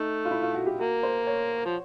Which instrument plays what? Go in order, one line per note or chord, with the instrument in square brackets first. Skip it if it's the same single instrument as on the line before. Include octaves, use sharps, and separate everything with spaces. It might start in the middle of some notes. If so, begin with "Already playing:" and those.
Already playing: [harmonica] A3 [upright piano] D#4
[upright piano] F4
E4
F4
F#4
G4
[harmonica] A#3 [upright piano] F#4
[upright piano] C5
C#5
[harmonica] F3